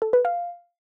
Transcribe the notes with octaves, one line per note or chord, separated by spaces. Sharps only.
A4
B4
F5